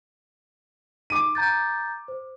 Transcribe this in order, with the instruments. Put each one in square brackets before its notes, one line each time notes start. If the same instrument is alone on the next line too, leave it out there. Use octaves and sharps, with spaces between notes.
[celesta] D#4 [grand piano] D6 D#7
[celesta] A#5 G6 A6
C5